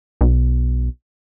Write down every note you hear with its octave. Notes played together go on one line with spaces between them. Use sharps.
B1